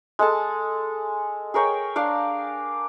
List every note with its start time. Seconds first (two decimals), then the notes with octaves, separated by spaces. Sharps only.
0.19 G#3 A4 A5
1.54 G#4 A#4 C#5 G5
1.96 D4 D5 F5